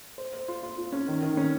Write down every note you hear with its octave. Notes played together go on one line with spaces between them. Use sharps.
C5
C5
F4
F4
F4
C#4
D#3
D#3
C#4